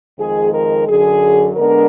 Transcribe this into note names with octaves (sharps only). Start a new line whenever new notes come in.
F2 D#3 G#3 G#4
A#4
F#2 D3 F#3 G#4
D3 G#3 B3 D4 A#4